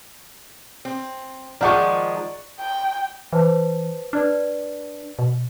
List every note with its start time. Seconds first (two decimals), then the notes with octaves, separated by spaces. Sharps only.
0.85 C4
1.61 D#3 F3 G#3 D5 F#5 C#6
2.59 G5
3.33 E3 B4 C5 A5
4.13 D4 B4 D5 F6
5.19 B2